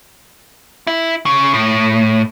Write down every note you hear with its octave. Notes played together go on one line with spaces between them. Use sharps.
E4
C#3
A2